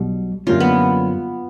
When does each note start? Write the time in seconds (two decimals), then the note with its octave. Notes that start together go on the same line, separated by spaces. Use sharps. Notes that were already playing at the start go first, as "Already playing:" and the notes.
Already playing: B1 B2 G3
0.47 F#2 D3 G3 A#3 C#4 F4
0.60 B3